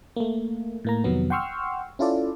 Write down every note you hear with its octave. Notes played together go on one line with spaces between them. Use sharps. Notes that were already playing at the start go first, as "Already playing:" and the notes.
A3 A#3
A2 A#3 A#5
F2 C3 D#3 F#3 B3
F#5 G5 C6 C#6 E6 F6
C#4 E4 F4 A4 D5